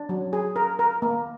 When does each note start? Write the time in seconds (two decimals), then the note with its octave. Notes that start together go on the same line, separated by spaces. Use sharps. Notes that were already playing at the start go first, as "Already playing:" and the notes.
Already playing: D4
0.09 F#3
0.33 G#4
0.56 A#4
0.79 A#4
1.02 A#3